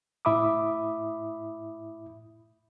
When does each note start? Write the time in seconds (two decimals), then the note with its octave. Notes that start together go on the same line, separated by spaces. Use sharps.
0.25 A2 E4 E5 B5 D6 D#6